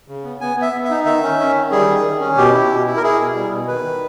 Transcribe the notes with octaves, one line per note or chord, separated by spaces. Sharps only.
C#3
B3
B3 G#5
B3
E5
B3
E5
D#4
D#3 E5
C#4
C#4
D#3
G3 G#4
D#3
D#3
C#4
B2 G4
E4
B2
E4
A#4
E4 G#4
B2
G3
B2
D#3 B4
D#3